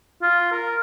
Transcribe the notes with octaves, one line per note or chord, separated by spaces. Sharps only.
F4
A#4